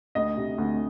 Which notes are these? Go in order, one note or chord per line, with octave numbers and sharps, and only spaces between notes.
D2 D#5
C3
D2